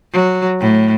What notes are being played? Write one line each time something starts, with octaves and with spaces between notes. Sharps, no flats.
F#3
A2